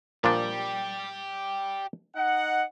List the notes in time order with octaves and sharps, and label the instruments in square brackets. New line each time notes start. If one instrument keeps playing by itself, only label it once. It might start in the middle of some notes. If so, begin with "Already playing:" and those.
[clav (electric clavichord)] A#2 F3 D4 [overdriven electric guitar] G4 D5
[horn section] D#4 D#5 F#5